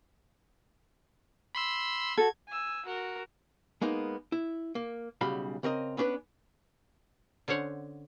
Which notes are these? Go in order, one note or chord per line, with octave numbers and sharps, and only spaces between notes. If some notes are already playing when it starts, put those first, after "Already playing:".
B5 C6 E6
F#4 A4 G#6
G#5 E6
F#4 A#4
G#3 A#3 B3 D#4
E4
A#3
B1 C#3 G3 F#4 F5 B5
C#3 C4 A#4 D#5
B3 C#4 D4 G#4 B4
D3 C#4 C5 C#5 F#5